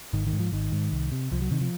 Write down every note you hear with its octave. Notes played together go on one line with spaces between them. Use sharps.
G#1 D#3
D#3
G#2
F3
G#1 D#3
G#2
C2
C3
C2 F3
F#3
C3 D#3
F3